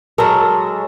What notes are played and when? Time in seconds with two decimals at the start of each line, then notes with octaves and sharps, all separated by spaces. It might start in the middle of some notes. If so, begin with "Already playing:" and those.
0.18 F#3 G#3 A4 A#4